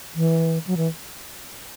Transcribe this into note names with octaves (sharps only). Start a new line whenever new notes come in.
E3
F#3
E3